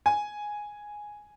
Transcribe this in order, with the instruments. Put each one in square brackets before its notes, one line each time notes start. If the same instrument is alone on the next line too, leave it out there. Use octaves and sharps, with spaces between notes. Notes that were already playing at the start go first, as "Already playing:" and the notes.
[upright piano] G#5